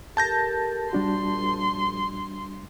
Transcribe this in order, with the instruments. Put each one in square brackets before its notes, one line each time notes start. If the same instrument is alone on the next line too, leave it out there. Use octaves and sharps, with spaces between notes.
[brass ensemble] G4 A4 A#4 [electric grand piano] A5 G6 A#6
[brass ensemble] A#1 [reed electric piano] G3 D4 F#4 [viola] C6